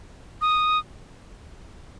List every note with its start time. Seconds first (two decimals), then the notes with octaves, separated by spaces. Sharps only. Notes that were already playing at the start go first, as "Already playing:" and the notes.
0.41 D#6